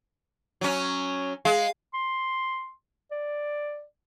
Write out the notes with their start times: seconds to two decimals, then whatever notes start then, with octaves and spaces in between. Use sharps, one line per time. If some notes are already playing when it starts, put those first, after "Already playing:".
0.61 F#3 C#4
1.45 G#3 F5
1.94 C6
3.12 D5